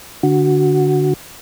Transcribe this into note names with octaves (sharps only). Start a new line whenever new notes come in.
D3 F#4